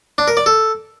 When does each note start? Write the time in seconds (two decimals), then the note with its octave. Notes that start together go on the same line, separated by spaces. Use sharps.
0.18 D4
0.28 A#4
0.37 D5
0.46 A4